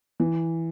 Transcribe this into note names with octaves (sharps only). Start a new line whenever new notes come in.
E3